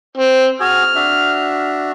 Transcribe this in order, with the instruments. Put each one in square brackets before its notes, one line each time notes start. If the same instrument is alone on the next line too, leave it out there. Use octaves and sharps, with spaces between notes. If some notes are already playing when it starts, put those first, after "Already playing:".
[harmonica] C4
[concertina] F#4 G#4 G#5 [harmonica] F6
[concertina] D4 F#4 E5